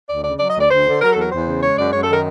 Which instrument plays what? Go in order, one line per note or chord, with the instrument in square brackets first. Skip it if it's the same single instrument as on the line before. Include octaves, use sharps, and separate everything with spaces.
[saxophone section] D2 D5
C#3 D5
F#3 D5
D#5
D2
D5
D2 C5
D3
F#3 A#4
A4
E2 A#4
E2 C5
C#3
G#3 C#5
F#2 D5
F#2 C#5
A4
D#3 A#4